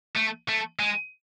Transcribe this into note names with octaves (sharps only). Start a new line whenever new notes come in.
A3
A3
G#3